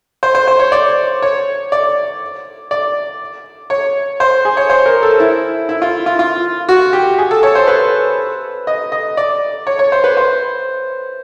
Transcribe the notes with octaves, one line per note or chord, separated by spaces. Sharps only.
C5
C5
C5
C#5
D5
C#5
D5
D5
C#5
C5
G#4
C#5
C5
A#4
A4
E4
E4
F4
F4
F4
F#4
G4
G#4
A4
C#5
C5
B4
D#5
D#5
D5
C#5
C#5
C5
B4
C5